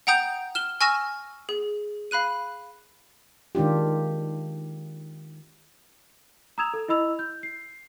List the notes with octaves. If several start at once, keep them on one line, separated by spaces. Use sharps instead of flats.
F#5 G5 A#5 D#6 G6
F6 E7 G7
G#5 C#6 E6 F6 A#6 E7
G#4
F5 B5 F#6 D#7
D#3 G#3 D4 F4 G4
A#5 D#6 E6 G#6 E7 F7
A4
E4 D#5 B5 E6 F7
G6
C7